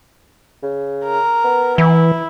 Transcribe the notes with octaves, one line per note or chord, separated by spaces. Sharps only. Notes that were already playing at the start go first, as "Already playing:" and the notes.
C#3
A#4
B3
E3 E4